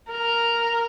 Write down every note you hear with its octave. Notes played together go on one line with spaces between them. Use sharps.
A#4